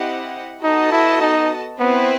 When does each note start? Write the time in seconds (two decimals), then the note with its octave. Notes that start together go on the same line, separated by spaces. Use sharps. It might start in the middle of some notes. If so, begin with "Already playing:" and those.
Already playing: C4 E4 G4 D#5 F#5
0.63 B3 D#4 F#4 A4 D#5 A5
0.92 E4
1.21 D#4
1.79 B3 C4 E4 B4